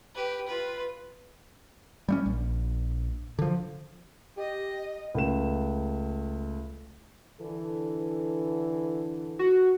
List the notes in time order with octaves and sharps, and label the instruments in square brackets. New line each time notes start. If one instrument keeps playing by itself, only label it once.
[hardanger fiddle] G4 B4
F4 B4
[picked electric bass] G3 A3 C#4
A#1
D3 F3
[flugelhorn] G4 [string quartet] D#5
[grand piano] C#2 A3 E7
[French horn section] D3 E3 A4
[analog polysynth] F#4